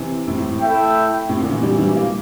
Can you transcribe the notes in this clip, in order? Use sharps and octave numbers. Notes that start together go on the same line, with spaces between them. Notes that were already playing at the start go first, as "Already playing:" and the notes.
Already playing: C3 E3
A2 C3
A2
A2
A3 E4 A4 E5 G5
A2 C3
A#2 D3
C3 E3
E3 G3
E3 G3
G3 A#3